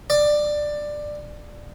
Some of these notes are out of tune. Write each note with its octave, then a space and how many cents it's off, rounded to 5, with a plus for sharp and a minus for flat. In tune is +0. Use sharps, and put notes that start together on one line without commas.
D5 +15